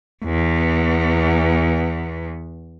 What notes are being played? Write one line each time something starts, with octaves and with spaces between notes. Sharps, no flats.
E2 B3